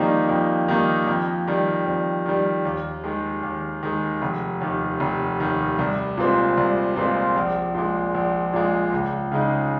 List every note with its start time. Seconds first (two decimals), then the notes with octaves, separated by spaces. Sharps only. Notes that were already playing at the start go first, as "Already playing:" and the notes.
Already playing: F2 D#3 G3 A#3 D#4
0.29 F2
0.68 D#3 G3 A#3 D#4
1.08 F2
1.48 D#3 G3
1.86 F2
2.26 D#3 G3
2.65 D#2
3.04 D#3 G#3
3.43 D#2
3.83 D#3 G#3
4.22 F1
4.61 D#2 D#3
5.00 F1
5.40 D#2 D#3
5.79 C2
6.18 A#2 G#3 C4 F4
6.57 C2
6.96 A#2 G#3 C4 F4
7.36 A#1
7.74 A#2 G#3
8.14 A#1
8.53 A#2 G#3
8.92 C#2
9.32 C#3 G#3 D#4